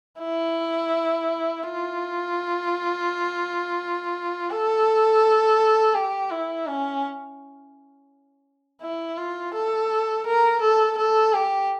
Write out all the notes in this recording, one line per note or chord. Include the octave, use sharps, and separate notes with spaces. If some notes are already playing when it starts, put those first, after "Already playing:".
E4
F4
A4
G4
E4
C#4
E4
F4
A4
A#4
A4
A4
G4